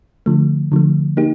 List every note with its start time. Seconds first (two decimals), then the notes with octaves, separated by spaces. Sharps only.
0.26 D3 F3 A3
0.72 D3 F3 A3
1.17 A#3 D#4 G4